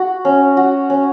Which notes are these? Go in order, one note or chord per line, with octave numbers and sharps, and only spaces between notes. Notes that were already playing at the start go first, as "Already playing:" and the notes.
Already playing: F#4
C#4
F#4
C#4